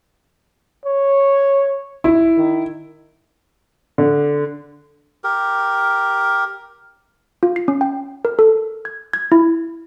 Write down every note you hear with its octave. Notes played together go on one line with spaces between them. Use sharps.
C#5
E4
D#3
D3
G4 A#4
F4
C7
C#4
G5
A#4
A4
G#6
G#6
E4